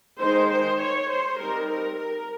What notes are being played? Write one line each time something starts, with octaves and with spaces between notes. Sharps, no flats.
D#3 G#3 D#4 C5
C5
C#5
C5
G3 C4 D#4 A#4
A#4
A#4